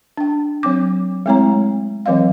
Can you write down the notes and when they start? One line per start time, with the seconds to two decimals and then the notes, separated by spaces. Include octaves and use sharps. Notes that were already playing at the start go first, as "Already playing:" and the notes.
0.17 D4 G5
0.63 F#3 C4 D6
1.26 G#3 A3 C4 E4 C#5 A#5
2.06 E3 F#3 C4 D#5 F5